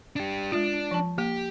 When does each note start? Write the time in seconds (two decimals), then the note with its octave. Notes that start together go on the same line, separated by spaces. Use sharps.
0.16 D4 G4
0.52 G#3 D4 F4
0.91 F3 A5
1.18 A#3 G4